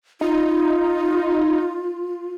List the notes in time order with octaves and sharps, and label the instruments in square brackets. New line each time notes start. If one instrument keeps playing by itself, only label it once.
[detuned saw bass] D#4 [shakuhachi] F4